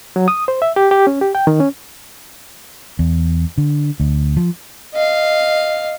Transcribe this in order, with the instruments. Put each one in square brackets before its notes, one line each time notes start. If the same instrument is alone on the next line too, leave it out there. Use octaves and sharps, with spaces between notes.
[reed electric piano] F#3
D#6
C5
E5
G4
G4
C#4
G4
G5
D#3
C#4
[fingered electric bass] E2
D3
D2
F3
[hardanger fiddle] D#5 F5